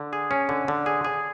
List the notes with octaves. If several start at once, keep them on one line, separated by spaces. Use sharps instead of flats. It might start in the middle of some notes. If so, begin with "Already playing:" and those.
Already playing: D3
G#4
C#4
D3
D3
G#4
G#4